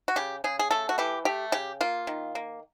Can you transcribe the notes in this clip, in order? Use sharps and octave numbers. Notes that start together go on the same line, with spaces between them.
F#4
C#3 G4
C#3 G#4
G#4
A3 A4
F#4
E3 G4
A3 G4
C#3 G4
A#3 F4
D#3
A#3